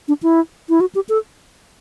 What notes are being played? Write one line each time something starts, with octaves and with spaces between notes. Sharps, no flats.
D4
E4
E4
F#4
G4
A4